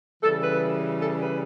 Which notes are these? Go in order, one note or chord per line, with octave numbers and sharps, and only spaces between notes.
C#3 E3 G3 A4
B4
A4
B4